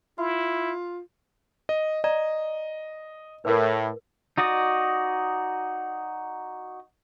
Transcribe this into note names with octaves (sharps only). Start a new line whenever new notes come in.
E4 F4
D#5
D5 D#5 A#5
A2 A#4 B4
D#4 F#4 D5 D#5